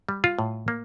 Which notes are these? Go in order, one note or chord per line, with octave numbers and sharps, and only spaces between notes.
G3
F4
A2
A#3